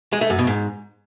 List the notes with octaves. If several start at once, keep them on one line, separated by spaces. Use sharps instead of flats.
G#3
A3
F#2
B2
G#2